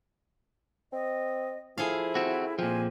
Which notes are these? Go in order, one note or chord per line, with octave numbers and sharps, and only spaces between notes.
C4 D#5
F3 E4 G#4 A4 F5
C4 F#4
A#2 F3 C4 G#5